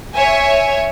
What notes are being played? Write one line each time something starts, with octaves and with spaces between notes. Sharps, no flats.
C#5 E5 G#5